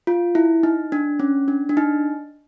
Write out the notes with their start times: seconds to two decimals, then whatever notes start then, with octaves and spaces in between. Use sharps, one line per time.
0.07 F4
0.35 E4
0.63 D#4
0.92 D4
1.20 C#4
1.48 D4
1.69 D4
1.77 D#4